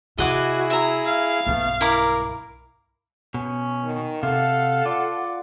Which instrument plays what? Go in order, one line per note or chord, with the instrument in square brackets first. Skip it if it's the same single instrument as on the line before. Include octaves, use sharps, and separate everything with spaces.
[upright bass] C3 [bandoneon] E4 G#4 [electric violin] F#4 [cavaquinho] D#5 F#5 D6
[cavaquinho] E5 A#5
[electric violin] F5
[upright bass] B1 G2 [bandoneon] A3 B3
[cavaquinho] E4 A#5 D6 [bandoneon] A#4
[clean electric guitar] B2 [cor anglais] C#4
[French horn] D#3
[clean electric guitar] C3 [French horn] A4 [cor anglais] F5 [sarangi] F#5
[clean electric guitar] F4 [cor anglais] D5